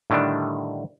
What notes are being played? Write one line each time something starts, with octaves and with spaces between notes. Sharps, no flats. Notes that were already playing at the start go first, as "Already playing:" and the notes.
A2 D3 D#3 G3 D4